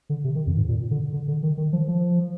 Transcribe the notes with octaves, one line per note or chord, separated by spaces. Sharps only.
D3
C3
D#3
F2
G#2
A#2
D3
D3
D3
D#3
D#3
F3
F3